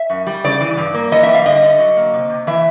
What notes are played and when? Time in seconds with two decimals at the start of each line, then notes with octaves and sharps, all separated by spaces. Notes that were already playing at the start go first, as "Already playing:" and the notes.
Already playing: E5
0.10 F#2
0.27 G3
0.44 C#3 D5
0.61 E3
0.77 G2
0.94 A#3
1.11 E3 D#5
1.23 E5
1.28 G3
1.35 F5
1.46 D3 D#5
1.63 D3
1.79 F#3
1.96 A#3
2.13 C3
2.30 C3
2.47 E3 E5